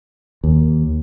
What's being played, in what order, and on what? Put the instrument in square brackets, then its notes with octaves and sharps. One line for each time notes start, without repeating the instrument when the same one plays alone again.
[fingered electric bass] D#2